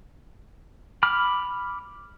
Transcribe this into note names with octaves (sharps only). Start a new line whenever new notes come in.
B5 D6 F6